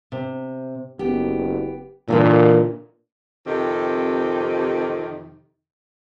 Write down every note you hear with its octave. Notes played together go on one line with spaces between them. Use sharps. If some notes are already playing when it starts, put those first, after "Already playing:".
C3
F#1 B3 G4
A#2 D3 E3 A#3
F2 C3 D#3 C4 G4